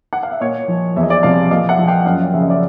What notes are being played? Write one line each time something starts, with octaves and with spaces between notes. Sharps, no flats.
F#5
F5
E5
A#2 C#5 D#5
F3
E2 E5
D#5
D5 E5
C3 F3 D#5 F5
A#2 D#5 F5
E5 F#5
F3
F5 G5
F#2 D#5 F5
C#3 F3 E5
D#5
D5 E5